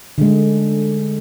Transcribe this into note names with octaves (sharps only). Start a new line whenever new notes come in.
D3 G#3